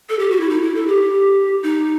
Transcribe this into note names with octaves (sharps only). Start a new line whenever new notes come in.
A4
G4
F#4
E4
D#4
E4
A4
G4
D#4